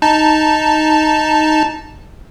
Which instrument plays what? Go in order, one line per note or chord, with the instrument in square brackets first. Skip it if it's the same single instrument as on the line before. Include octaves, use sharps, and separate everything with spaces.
[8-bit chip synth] D#4 A5